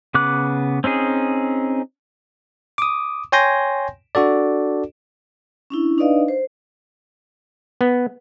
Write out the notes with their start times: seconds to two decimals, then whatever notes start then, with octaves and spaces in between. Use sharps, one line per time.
0.14 C#3 B3 D6 F#6
0.84 C4 C#4 D#4 G#4
2.78 D6 D#6
3.32 C#5 G5 G#5 C6 G6 A#6
4.15 D4 F#4 A4 D5
5.70 C#4 D4 E4
5.98 D4 D#4 B4 D5 D#5 F5
6.28 C5
7.81 B3